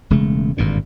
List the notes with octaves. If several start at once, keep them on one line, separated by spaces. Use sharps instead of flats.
E1 C#3 G#3 A3
G#1 G2 A#2 D3